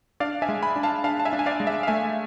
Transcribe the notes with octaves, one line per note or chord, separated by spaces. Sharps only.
D4 D5 F5
E5 G#5
G#3
G#5 B5
D4
F5 A5
D4 F5 A5
A5
E5 G#5
D4
G#5
D5 F5
G#3
E5
F5
A3 E5 G#5